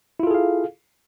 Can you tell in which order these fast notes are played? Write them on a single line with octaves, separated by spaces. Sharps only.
E4 F4 A4 G#4 F5